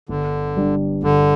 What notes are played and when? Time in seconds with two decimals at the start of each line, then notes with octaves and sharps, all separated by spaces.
0.09 G1 D3
0.56 G2 G3 D4
1.03 G1 D3